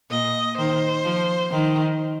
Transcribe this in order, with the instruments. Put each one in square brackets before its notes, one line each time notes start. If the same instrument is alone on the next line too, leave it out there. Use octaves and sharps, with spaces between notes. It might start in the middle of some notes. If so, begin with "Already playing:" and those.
[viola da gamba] A#2 [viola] D#5
[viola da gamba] D#3 [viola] C5
[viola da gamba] F3
[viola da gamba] D#3 [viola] C5